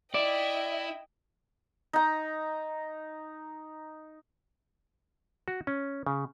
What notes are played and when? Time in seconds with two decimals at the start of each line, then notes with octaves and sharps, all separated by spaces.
0.14 E4 D5 D#5 G5
1.93 D#4 A#5
5.48 F#4
5.67 C#4
6.07 C#3